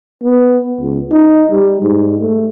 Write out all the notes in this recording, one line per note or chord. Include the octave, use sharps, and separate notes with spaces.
B3
C#2
D#4
G3
G#2
A3